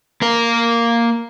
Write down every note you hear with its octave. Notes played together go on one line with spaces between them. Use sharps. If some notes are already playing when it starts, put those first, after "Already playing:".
A#3 A#4